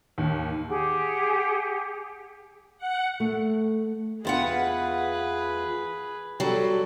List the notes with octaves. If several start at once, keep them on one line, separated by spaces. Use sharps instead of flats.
D#2
G4 G#4 F#5 G5
F#5
A3
E2 F4 G#4 B4 F#5
F#3 G3 A4